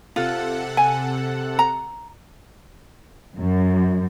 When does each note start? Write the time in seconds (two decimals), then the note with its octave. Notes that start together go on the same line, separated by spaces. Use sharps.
0.16 C3 F4 A4 F#5
0.77 G#5
1.59 A#5
3.38 F#2